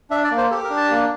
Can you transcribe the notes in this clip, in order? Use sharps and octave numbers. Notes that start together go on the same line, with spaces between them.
D4 E5
D5
A#3
C5
G4 A4
A#4
D4
A5
A#3